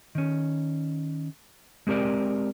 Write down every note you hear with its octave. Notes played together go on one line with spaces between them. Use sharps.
D#3 C#4
G#3 C4 G4 A#4 D5